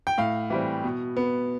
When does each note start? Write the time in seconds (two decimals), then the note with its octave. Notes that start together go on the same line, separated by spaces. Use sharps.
0.07 G5
0.18 A2 F5
0.50 E3 G3 C4
0.84 B2
1.17 B3